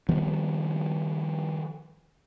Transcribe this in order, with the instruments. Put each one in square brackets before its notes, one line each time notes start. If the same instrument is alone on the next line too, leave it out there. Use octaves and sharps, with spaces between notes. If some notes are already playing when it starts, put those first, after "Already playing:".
[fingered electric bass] D#3 F3 G3 B3